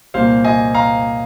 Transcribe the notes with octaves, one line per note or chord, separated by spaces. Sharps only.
C2 A#2 A#3 C5 F5
D#5 G#5
F5 A#5